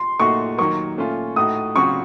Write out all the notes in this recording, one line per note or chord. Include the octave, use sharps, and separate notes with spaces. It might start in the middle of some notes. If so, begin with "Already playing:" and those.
Already playing: C6
A#2 A3 D#4 F#4 C#6
D#3 F#3 A#3 C#6
A#2 A3 C#4 F4
A2 A3 D#4 F#4 D#6
C#3 F#3 C4 F#4 C#6